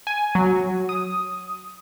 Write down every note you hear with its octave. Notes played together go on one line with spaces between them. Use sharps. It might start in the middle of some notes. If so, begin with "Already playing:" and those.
G#5
F#3
D#6